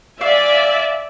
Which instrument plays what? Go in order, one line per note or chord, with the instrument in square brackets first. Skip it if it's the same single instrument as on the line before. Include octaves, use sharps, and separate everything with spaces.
[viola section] D5 E5 G#5 [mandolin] F5